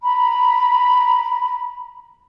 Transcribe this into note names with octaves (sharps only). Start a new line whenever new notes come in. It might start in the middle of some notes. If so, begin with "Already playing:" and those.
A#5 B5